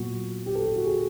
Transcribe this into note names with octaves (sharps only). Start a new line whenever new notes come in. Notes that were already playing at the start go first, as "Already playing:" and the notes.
Already playing: A#2 F#3 B3 F#4
G4
A4
G4
F#4
G#4